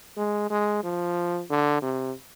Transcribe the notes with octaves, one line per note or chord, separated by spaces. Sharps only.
G#3
G#3
F3
D3
C3